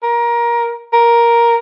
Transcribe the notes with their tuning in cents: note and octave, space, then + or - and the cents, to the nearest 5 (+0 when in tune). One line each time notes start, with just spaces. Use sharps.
A#4 +20
A#4 +10